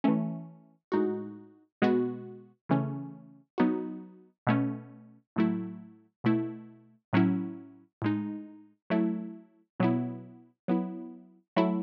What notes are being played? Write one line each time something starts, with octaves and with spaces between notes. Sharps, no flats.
E3 A3 C#4
A2 G#3 D#4 F#4
B2 G#3 B3 F#4
C#3 E3 A3 C#4
F#3 B3 D#4 F#4
B2 A3 C#4
A2 F#3 A3 E4
B2 A3 E4
A2 F#3 C#4 E4
A2 G#3 D#4
F#3 A3 E4
B2 F#3 B3 E4
F#3 B3 E4
F#3 A3 E4